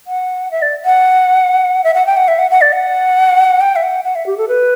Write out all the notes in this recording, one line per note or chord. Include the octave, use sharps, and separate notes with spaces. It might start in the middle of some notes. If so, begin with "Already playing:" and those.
F#5
E5
D5
F#5
E5
F#5
G5
F#5
E5
F#5
F#5
D5
F#5
G5
E5
F#5
F#5
E5
G4
A4
B4